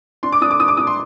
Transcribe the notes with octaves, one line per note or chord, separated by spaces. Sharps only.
D4 C6
D6
D4 D#6
D6
D4 D#6
D6
D4 D#6
C6